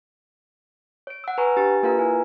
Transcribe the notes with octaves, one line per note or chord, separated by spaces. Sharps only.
C#5 D7
F#5 E6
B4 F#5 G#5 A#5 C#6
D4 G4 G#5 A6
A#3 F4 A#4 B4 F5 A#5
E4 G#5